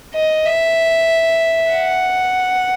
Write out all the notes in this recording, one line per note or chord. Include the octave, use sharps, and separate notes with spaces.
D#5
E5
F#5